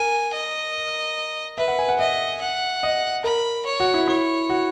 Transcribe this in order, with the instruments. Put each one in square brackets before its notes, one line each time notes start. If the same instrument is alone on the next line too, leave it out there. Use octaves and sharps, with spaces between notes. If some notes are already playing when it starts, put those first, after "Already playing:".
Already playing: [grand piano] A#4 [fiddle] G#5
[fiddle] D#5
[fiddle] B4 [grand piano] E5
[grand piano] F#5
G#5
F#5
[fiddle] D#5 [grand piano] E5
[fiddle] F#5
[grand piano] D#5
[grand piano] A#4 [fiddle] B5
[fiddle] C#5
[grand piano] F#4
E4
[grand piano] E4 [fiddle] C#5
[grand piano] F#4